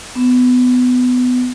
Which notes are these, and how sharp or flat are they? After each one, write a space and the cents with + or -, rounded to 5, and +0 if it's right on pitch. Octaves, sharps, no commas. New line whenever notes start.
B3 +20